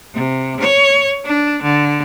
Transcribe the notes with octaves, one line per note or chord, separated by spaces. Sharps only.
C3
C#5
D4
D3